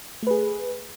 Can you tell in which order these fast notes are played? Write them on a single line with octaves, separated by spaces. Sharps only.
A3 B4 G#4